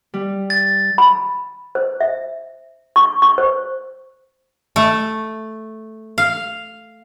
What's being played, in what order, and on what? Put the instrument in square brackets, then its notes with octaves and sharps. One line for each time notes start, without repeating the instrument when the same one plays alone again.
[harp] G3
[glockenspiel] A6
[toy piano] B5
C5
E5
C#6
C#6
C5
[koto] A3
F5